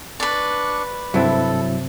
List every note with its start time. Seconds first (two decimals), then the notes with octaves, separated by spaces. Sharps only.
0.20 D4 B4 D5 C#6
1.14 G2 C3 F#3 C4 E4 A4